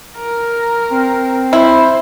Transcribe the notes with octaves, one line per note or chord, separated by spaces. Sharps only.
A#4
C4
E4 C5